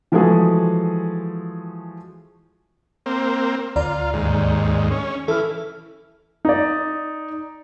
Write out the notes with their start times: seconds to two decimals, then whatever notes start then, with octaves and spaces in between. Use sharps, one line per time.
0.12 E3 F3 G#3 A3 F#4 G#4
3.06 A#3 C4
3.76 D2 F4 D5 A#5
4.13 D#2 G#2
4.91 C#4
5.28 E3 A4 F6
6.45 D#4 D5